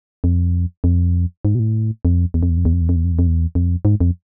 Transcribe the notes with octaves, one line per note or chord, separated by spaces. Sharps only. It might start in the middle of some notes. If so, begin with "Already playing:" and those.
F2
F2
G#2
B2
A2
F2
E2
F2
E2
F2
E2
F2
E2
F2
E2
F2
E2
F2
E2
F2
G#2
F2